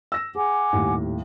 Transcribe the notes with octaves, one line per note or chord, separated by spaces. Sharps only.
E6 A#6 E7
G#4 F#5 G#5 D6
D#1 D#2 A2